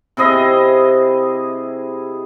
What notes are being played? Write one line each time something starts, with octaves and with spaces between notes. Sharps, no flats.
C3 E4 G#4 D#5